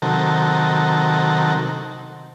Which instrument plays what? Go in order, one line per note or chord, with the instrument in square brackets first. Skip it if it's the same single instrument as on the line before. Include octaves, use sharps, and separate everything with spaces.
[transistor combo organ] C3 D#3 F#3 A4 A#4